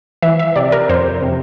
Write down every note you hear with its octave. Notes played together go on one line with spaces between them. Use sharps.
E3 E5
E5
C3 D5
A#4
F2 C5
C3